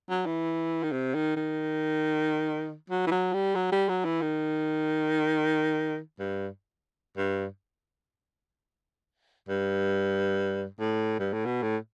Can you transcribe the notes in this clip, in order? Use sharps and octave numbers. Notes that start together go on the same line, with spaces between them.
F#3
E3
D#3
C3
D#3
D#3
F#3
E3
F#3
G3
F#3
G3
F#3
E3
D#3
G2
G2
G2
A2
G2
A2
B2
A2